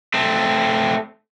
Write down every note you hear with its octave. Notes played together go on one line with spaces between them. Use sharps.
A3 C4